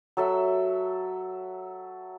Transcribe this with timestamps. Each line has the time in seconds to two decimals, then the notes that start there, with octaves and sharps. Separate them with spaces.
0.17 F#3 A4 E5